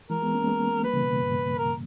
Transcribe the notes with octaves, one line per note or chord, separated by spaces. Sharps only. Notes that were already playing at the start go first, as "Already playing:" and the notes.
E3 G#3 A#4
G#3 B3
A#3 C#4
G#3 B3
G3 A#3 B4
C#3 E3
B2
G2
A#4